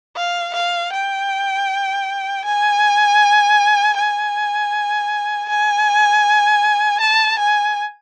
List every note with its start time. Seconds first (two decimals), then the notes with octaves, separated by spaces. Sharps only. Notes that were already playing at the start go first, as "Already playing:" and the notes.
0.16 F5
0.54 F5
0.93 G5
2.45 G#5
3.97 G#5
5.49 G#5
7.00 A5
7.39 G#5